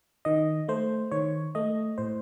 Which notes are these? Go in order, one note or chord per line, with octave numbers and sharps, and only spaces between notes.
D#3 D#5
A3 C5
D#3 C#5
A3 D#5
A2 C5